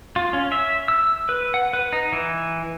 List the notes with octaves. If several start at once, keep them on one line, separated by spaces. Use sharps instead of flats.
F4
C#4
E5
E6
B4
F#5
B4
D#4
E3